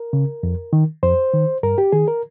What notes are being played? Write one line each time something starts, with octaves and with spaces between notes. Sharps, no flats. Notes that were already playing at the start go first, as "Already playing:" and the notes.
Already playing: A#4
C#3
F2
D#3
F2 C5
D#3
G2 A#4
G4
D#3 G#4
A#4